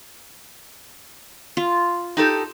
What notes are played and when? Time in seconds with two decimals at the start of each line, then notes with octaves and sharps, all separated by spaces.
1.57 F4
2.17 D#4 G4 A4